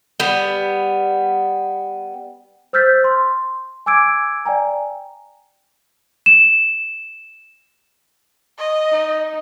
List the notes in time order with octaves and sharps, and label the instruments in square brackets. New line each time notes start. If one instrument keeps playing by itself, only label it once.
[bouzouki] G3 B3
[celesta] C5 E6 F6 G6 A6 B6
C6
G#5 D6 E6 G#6 D7
D5 G5 G#5 A#5
E7
[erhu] D#5
[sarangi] D#4